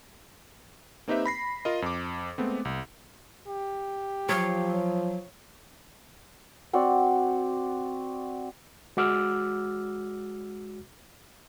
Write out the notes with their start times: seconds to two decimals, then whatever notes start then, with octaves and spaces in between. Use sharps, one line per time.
1.08 A#3 C4 D#4 G4 B4 E5
1.26 B5 A#6 C7
1.65 F4 A#4 D#5
1.82 F2 D6
2.38 G#3 A3 B3 C4
2.65 C2
3.48 G4
4.29 F3 F#3 C#5 F5
6.73 C4 F#4 D5
8.97 G#3 F#4 D6 E6 F6